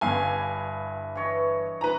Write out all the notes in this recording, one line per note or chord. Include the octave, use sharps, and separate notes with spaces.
G1 G2 E4 F5 G#5
E3 C#5 D#5
B4 A#5